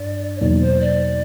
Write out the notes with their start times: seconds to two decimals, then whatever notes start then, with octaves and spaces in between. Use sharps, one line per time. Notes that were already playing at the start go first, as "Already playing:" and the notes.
Already playing: G2 D4 D5
0.36 C#5
0.41 E2 B2 F#3 A#3 D#4 D5
0.61 C5
0.81 D5